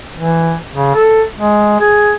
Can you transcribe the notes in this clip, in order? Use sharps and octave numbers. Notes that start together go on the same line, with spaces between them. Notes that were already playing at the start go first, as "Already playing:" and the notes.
E3
C#3
A4
G#3
G#4